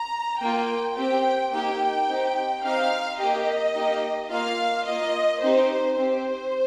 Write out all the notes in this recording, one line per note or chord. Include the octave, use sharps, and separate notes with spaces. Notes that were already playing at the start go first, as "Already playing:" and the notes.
Already playing: A#5
A#3 F4 G5
C4 G4 G5
A#3 D#4 G4 G5
C4 D#4 G4
C4 D#4 G4 F5
A#3 G4 D#5
A#3 D#4 G4
A#3 F4 F5
A#3 F4 D#5
C4 D#4 G4 C5
C4 G4 C5